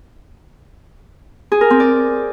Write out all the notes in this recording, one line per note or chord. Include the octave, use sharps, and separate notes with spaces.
G#4
A#4
C4
D5